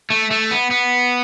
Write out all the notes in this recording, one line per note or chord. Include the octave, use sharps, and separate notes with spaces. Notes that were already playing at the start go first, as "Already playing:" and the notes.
A3
A3
B3
B3